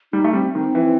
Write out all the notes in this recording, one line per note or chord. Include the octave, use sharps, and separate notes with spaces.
G3 D#4
A3
G3 C4
D#3 C4
E3